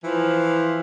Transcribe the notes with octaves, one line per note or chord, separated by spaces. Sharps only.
E3 F3